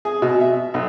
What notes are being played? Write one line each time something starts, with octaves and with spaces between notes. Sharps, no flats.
G#4
B2
E5
B1